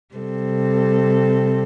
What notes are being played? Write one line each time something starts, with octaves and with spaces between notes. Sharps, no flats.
C3 G3 C4 A4